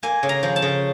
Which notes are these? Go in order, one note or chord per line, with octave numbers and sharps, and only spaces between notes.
A#3 G#5
C#3
A#5
F3
A5
C#3